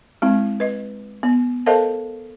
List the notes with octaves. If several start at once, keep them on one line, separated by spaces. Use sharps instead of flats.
G#3 C4 E4
B4 D#5
B3
A4 A#4 C5 D#5 F5 A5